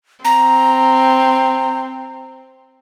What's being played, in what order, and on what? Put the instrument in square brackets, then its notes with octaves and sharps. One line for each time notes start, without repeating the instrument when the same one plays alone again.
[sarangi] C4 [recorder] A#5